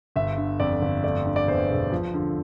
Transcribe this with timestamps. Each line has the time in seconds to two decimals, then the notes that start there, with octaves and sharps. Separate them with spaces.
0.16 G1 E5
0.38 D3
0.60 F2 D5
0.82 G1
1.03 A3 D5
1.26 D3
1.36 D5
1.48 E2 C5
1.70 E1
1.92 F3
2.14 D3